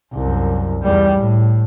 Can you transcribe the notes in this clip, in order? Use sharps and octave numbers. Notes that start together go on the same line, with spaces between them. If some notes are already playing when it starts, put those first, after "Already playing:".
C2 F#2
E2 G3
A2